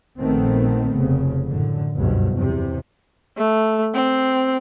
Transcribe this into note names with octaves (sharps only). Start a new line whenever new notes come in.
A#1 D#3 A3 B3 C4
F1 C#3
F#2 A2 D3
F#1 C#2 G2 B2 F3
E2 C3
A3
C4